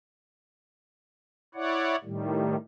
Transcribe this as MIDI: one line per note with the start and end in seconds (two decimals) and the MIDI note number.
1.55 1.96 64
1.55 1.96 73
1.55 1.96 74
1.55 1.96 78
2.04 2.56 45
2.04 2.56 51
2.04 2.56 55